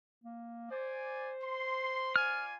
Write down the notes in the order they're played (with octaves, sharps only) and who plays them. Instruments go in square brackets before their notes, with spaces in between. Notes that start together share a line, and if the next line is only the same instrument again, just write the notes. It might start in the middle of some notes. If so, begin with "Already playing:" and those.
[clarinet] A#3
[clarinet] C5 [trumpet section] D5 G#5
[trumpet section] C6
[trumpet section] F4 D5 G#5 [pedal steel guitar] F6